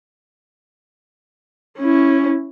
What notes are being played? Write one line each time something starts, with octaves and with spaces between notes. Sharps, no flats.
C#4 E4